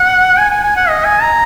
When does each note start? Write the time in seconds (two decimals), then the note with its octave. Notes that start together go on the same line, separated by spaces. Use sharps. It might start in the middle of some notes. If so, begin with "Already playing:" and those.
Already playing: F#5
0.38 G#5
0.50 G#5
0.64 G#5
0.76 F#5
0.89 D#5
1.05 G#5
1.22 A#5